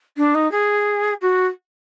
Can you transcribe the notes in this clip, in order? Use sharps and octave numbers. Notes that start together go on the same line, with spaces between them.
D4
D#4
G#4
F#4